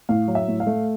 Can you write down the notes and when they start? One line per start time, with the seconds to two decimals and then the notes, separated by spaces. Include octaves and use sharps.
0.09 A2 F5
0.28 F#3
0.35 E5
0.48 A2
0.60 F5
0.67 A3